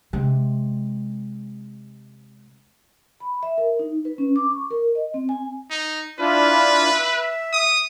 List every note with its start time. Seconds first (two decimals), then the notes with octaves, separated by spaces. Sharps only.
0.13 C3 G#3
3.20 B5
3.43 E5
3.58 A#4
3.79 D#4
4.05 B4
4.18 C#4
4.36 D6
4.51 C#6
4.71 A#4
4.95 D#5
5.14 C4
5.29 G#5
5.71 D#4
6.19 D4 E4 F4 B4
6.92 E5
7.53 D#6